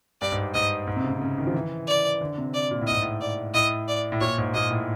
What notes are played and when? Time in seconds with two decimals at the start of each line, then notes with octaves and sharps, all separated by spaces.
0.22 G2 D5
0.32 G#2
0.54 G#2 D#5
0.87 G#2
0.96 C3
1.04 C#3
1.12 C3
1.21 C#3
1.38 D#3
1.47 F3
1.54 E3
1.87 D5
2.21 D3
2.38 C3
2.54 D5
2.71 A#2
2.81 A2
2.87 G#2 D#5
3.02 A2
3.21 D5
3.54 A2 D#5
3.88 D5
4.12 A2
4.20 A#2 C#5
4.38 G#2
4.54 A#2 D#5
4.71 A2